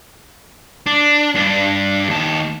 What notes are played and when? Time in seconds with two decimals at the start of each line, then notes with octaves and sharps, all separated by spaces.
0.86 D4
1.35 G2 D4
2.09 D#2 A5